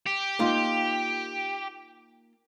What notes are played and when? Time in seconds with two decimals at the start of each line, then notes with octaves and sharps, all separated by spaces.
0.06 G4
0.39 A#3 D#4 F4